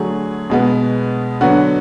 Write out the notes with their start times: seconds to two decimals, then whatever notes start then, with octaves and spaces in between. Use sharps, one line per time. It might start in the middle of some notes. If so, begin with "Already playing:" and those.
Already playing: D3 F#3 A3 G#4
0.50 B2 G#3 B3
1.41 D3 F#3 B3 F#4